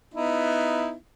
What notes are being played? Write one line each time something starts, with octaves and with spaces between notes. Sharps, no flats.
B3 D#4 E4